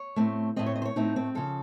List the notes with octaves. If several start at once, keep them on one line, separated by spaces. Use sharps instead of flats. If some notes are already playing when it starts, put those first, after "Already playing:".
Already playing: C#5
A2 A3 C4
A2 A3 C4 D#5
C#5
D#5
C5
C#5
A2 A3 C4 D#4
C4
C#3 F3 A4